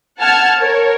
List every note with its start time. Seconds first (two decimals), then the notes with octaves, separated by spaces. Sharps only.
0.19 F#5 A5 F6 G#6
0.61 A#4 C#5